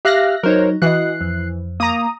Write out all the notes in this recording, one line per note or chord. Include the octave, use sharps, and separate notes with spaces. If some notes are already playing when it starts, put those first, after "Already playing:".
G4 E5 F5 F6 F#6 A#6
F#3 D#4 A#4 C5 C#5
E3 F#4 D#5 F#6 C7
F2
A#3 A#5 D#6